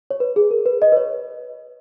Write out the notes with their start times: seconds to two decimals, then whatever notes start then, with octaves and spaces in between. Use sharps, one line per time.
0.11 C#5
0.20 B4
0.36 G#4
0.51 A#4
0.66 B4
0.82 D#5
0.92 B4
0.97 C#5